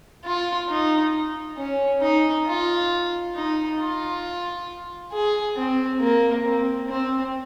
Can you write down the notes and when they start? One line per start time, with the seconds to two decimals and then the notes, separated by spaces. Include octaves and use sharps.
0.25 F4
0.69 D#4
1.58 C#4
2.01 D#4
2.47 F4
3.35 D#4
3.79 F4
5.12 G#4
5.56 C4
6.00 A#3
6.44 C4
6.89 C4